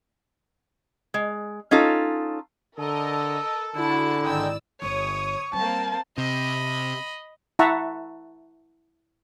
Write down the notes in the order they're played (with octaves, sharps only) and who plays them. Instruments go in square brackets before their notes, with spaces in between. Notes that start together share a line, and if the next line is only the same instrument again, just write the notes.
[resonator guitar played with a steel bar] G#3
C#4 D#4 F4 A4
[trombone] D3 [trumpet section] A4 [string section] A#4 D#5
[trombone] D3 [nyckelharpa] E4 [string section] F#4 G#4 A5
[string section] G#1 D5 E6 [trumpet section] G#3 D#4 G5
[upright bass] G1 [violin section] C#5 D#6 [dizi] C#6
[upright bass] G3 [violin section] A#3 C4 [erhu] A5
[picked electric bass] C3 [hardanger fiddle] D#5 B5
[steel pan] E4 E5 F#5 A5 A#5 C#6